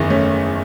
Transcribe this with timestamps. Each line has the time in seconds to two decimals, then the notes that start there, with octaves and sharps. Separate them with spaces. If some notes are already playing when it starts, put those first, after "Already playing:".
Already playing: F#1 E2 D#3
0.10 A3 C#4